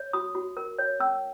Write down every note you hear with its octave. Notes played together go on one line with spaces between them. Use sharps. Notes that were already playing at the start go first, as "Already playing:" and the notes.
Already playing: C#5
F#4 D#6
F#4
A#4
C#5
C#4 E6